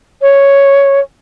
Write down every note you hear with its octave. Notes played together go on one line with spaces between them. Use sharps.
C#5